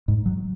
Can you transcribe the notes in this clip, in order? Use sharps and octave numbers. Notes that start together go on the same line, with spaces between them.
G#2
F#3